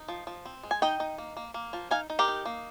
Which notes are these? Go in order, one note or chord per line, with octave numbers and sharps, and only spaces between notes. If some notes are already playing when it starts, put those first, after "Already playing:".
Already playing: D#4
F3
F3
C4
G#3
G#5
D#4 D#5 G5
D#4
A#3
A#3
A#3
F3
D#4 F5 G#5
D#4
G4 A#4
D#4
A#3